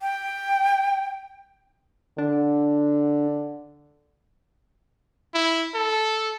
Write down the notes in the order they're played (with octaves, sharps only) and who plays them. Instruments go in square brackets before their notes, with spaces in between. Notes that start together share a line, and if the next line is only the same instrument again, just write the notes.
[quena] G5
[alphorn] D3 [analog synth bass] D4
[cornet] E4
A4